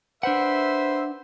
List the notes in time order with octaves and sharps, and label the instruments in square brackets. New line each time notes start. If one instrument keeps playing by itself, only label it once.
[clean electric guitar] D4 F#5 [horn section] B4 C5 E5